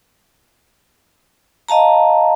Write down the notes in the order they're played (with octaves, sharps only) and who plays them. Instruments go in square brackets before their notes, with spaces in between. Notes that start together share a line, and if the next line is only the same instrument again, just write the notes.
[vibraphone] D#5 F5 A5 A#5